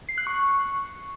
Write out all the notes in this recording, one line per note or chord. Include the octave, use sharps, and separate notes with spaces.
C7
F#6
C#6